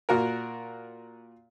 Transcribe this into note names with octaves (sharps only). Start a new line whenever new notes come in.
A#2 F#4 A#4